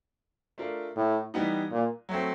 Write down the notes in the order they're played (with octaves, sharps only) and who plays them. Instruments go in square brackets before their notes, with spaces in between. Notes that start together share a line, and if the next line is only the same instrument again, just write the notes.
[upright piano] A3 D4 F4 A#4
[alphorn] A2
[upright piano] E3 G3 B3 D#4
[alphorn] A#2
[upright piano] F#3 A3 C4